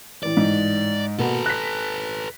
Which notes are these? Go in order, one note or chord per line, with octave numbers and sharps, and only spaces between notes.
A1 E3 D5
G#2
B2 A#3 F#4 A4 B4
F#6 A#6 B6